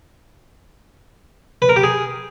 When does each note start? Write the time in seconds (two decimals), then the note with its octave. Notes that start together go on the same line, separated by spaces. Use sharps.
1.62 B4
1.69 A#4
1.76 G4
1.83 G#4